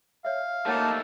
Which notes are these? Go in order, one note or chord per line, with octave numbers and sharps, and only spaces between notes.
C#5 E5 F5
D#3 A3 A#3 D#4 G4 C#5 F#5 A5